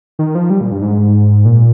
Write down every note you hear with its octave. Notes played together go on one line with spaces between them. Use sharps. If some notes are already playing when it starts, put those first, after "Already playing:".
D#3
F3
G3
A#2
G2
G#2
A#2